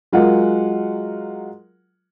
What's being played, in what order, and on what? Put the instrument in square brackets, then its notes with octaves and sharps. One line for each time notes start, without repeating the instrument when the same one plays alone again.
[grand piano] F#3 G#3 F4 A#4 F#5